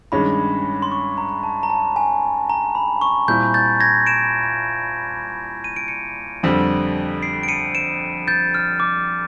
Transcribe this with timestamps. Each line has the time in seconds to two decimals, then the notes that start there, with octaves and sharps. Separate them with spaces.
0.12 G2 D#3 G#3 C#4 B5
0.82 C6
0.92 C#6
1.18 A#5
1.43 A5
1.63 A#5
1.70 A5
1.96 G#5
2.50 A#5
2.75 B5
3.01 C#6
3.28 A#2 G3 C4 E4 G6
3.54 G6 A6
3.80 G#6 A#6
4.06 D7 E7
5.64 D#7
5.76 D7
5.88 C#7 D#7
6.43 F2 D3 G3 C4
7.22 C7 D7
7.43 D7
7.48 C#7 D#7
7.75 D7 E7
8.28 G6 A6
8.54 F6
8.80 D6